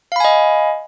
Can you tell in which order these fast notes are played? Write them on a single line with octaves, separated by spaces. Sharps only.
F5 B5 G#5 D#5